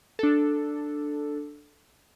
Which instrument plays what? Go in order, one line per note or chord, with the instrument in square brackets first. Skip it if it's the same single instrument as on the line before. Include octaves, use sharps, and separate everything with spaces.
[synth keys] D4 A4